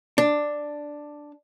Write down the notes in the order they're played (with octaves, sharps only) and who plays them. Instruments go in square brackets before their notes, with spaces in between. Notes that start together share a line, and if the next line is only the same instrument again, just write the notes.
[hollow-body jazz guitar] D4